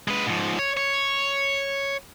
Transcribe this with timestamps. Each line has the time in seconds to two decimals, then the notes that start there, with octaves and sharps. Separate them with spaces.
0.08 G#3 B4
0.27 G#2 F3
0.59 C#5
0.77 C#5